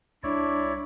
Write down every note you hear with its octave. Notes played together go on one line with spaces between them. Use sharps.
C2 D4 E4 C#5 D5